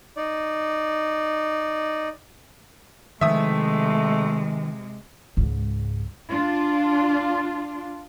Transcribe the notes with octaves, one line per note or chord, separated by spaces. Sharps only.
D#4 D5
C3 D#3 F3 G#3 A3 E5 D#6
C#2 G#2
D4 F4